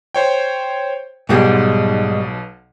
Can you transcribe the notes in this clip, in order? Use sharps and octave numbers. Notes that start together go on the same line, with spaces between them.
C5 C#5 G5
B1 G#2 B2 G3 G#3